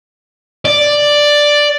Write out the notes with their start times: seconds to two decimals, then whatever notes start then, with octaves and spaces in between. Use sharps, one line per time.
0.65 D5